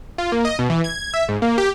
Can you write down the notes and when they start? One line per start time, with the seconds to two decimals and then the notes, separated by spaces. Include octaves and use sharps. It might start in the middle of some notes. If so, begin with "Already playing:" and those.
0.18 F4
0.32 A#3
0.45 D#5
0.59 B2
0.70 E3
0.84 G#6
1.14 E5
1.29 G#2
1.42 A#3
1.58 G4